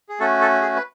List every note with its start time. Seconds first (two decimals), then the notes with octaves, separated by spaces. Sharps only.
0.09 G#4
0.20 A3 C#4 F#4 A4
0.41 A4
0.61 G#4
0.76 B4